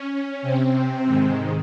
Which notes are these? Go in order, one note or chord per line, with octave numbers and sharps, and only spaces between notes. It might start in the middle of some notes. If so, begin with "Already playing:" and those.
Already playing: C#4
C3 C4
G#2 D#3 G#3